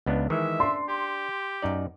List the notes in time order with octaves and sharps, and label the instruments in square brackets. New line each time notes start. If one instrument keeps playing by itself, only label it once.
[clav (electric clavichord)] C#2 B3 D4
[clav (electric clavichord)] D#3 E3 G#3 [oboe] E5
[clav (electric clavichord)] D4 [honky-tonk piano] C6
[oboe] G4
[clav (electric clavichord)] F#2 D#4 D5